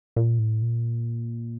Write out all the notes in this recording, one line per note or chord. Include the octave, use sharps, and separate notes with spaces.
A#2
A2
A#2